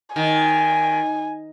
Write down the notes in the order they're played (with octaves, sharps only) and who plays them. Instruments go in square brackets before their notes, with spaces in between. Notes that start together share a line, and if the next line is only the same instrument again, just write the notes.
[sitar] D#3 [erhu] G#5